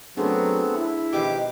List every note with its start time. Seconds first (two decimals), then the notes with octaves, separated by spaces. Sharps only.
0.17 C#3 F#3 A3 B3 C4 D4 G#4
0.74 E4
1.13 B2 D#3 F3 G4 D6